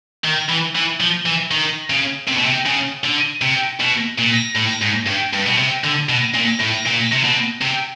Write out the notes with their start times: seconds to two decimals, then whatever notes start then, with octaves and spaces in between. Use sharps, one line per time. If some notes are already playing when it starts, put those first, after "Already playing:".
0.24 D#3
0.49 E3
0.75 E3
1.00 F3
1.26 E3
1.51 D#3
1.90 C#3
2.27 C3
2.37 B2
2.45 C3
2.66 C#3
3.04 D3
3.42 C3
3.80 B2
4.19 A#2
4.56 A2
4.82 G#2
5.07 G2
5.34 G2
5.47 B2
5.58 C3
5.84 D3
6.09 B2
6.34 A#2
6.60 A2
6.86 A#2
7.12 C3
7.24 B2
7.62 C3